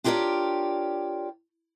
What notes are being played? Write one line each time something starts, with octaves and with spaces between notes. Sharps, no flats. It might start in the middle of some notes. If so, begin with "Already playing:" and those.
D4 F4 G4 A#4 C#5 D5